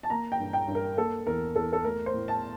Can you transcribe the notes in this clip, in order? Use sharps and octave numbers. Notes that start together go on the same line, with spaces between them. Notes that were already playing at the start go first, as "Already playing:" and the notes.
A5
A#3 A#5
G5
G2
G5
G2
A#4
A#3 A4
E2 A#4
E2 A4
A4
A3 A#4
C5
A2
A5